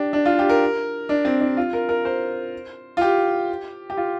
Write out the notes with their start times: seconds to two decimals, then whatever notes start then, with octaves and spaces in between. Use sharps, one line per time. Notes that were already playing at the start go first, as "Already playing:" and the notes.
Already playing: D4 G4
0.13 D4
0.26 F4
0.39 G4
0.49 A#4
1.09 D4
1.25 C4
1.41 D4
1.57 F4
1.73 A#4
1.89 A#4
2.05 C5
2.97 F4
3.01 G4
3.90 G4
3.97 F4